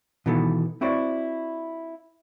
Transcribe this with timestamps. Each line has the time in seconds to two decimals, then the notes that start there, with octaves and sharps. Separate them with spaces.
0.26 B2 D#3 E3 B3 D#4 A4
0.81 C4 E4 F#4 B4 C5 D5